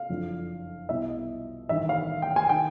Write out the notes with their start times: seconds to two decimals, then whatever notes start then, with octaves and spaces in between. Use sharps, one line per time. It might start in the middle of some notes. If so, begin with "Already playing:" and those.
Already playing: F5
0.09 F#1 F2 D3
0.89 C2 B2 E5
1.09 D#5
1.69 A1 G2 D#3 E5
1.89 F5
2.22 G5
2.36 G#5
2.49 D#3 G5